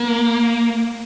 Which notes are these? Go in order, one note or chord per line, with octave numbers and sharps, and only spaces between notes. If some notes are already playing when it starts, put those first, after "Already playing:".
Already playing: A#3